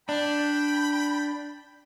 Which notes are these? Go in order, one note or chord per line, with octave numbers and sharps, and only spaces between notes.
D4 G5 B5